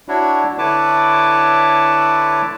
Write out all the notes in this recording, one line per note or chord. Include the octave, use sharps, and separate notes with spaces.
D4 E4 F#4 C#5
D3 E4 B4 C#5 A5 D6